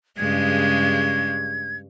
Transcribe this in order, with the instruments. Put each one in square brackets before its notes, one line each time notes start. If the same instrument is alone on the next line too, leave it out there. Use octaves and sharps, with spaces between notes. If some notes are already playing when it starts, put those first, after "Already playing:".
[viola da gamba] G2 C#3 G#3 [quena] G#6